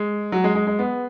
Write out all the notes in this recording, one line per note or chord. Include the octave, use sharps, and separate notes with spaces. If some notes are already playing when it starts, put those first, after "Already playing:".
Already playing: G#3
F#3
G#3
G#3
G#3
B3